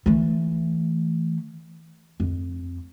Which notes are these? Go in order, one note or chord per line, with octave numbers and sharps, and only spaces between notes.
E3 A3
F2